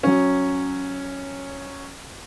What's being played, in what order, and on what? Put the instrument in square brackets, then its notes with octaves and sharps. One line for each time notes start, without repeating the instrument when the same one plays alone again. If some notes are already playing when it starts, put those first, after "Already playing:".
[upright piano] F#3 C#4